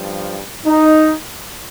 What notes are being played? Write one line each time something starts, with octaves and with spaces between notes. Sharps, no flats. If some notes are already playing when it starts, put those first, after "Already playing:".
Already playing: G2 F3
D#4